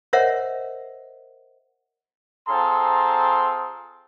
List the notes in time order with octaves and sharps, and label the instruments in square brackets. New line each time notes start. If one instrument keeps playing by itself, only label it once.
[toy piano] A#4 C5 C#5 D#5 E5 F#5
[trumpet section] C4 F4 G#4 A4 A#5 C6